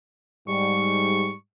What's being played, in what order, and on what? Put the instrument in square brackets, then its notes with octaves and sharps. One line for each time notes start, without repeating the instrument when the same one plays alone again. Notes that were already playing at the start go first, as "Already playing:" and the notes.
[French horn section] G#2 G3 [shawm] C#6